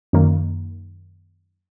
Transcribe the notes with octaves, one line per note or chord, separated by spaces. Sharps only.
F#2 D#3 A#3